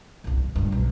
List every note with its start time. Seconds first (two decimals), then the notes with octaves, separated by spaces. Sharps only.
0.24 G1 C2
0.37 E2
0.55 C#2 G2
0.72 B1